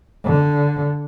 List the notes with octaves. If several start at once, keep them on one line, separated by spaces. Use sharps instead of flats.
D3